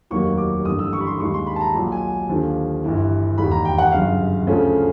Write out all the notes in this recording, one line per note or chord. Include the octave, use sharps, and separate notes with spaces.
F1 D#2 D#3 F#3 A#3 C#6
D6
A1 G2 D3 D#6
E6
C#6
B5
C6
D#2 D#3 G#3 C#6
C6
B5
A5
A#5
B1 A#2 F#3
G#5
D#2 D3 F3
G1 G2 E3
E1 D#2 D#3 B5
A#5
G5
F#5
G1 F#2 C#3 F5
D2 C#3 F3 A3 C#4